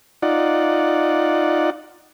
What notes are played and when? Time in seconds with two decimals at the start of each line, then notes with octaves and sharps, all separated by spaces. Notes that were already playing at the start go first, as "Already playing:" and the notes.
0.22 D#4 F4 D5 F#5